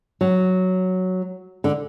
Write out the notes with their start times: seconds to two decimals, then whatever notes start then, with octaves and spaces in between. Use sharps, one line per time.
0.21 F#3
1.64 D3